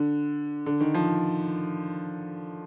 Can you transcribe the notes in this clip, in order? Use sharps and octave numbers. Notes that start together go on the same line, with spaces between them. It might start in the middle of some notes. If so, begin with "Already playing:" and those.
Already playing: D3
D3
D#3
F3